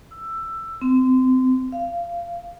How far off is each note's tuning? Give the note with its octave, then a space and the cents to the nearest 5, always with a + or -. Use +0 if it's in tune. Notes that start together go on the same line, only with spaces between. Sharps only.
E6 +15
C4 -25
F5 -20